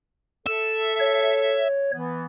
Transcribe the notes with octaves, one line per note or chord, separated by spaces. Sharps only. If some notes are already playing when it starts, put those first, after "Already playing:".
A4 E5
C#5
E3 B3